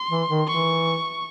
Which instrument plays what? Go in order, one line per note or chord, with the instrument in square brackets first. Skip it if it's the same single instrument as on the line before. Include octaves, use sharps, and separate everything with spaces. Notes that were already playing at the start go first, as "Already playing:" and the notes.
Already playing: [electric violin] C6
[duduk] E3
D#3
[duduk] E3 [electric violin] C#6